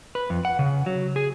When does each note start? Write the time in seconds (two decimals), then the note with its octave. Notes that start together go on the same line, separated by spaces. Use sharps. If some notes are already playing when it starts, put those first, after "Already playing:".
0.15 B4
0.30 F2
0.45 F#5
0.59 C#3
0.86 F#3
1.16 G#4